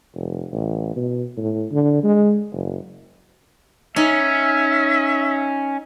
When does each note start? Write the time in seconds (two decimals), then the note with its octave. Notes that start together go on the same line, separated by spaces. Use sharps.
0.15 F1
0.52 A1
0.96 B2
1.37 A2
1.72 D3
2.03 G#3
2.52 F#1
3.96 C#4 D#4 E5